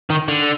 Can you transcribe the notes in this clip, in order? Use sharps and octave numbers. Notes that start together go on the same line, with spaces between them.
D#3
D3